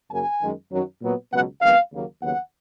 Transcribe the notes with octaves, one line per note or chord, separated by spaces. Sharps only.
F#2 C#3 F#3 A#3 G#5
F#2 D#3 G#3
F#2 D#3 F#3
A#2 F#3 B3
C#2 B2 F#3 B3 F#5
F2 D#3 G#3 B3 F5
D#2 C#3 F#3 A#3
D#2 C#3 F#3 B3 F#5